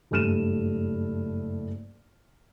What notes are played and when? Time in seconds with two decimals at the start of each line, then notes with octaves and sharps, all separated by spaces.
0.11 F#1 G2 A3 F6 D#7 E7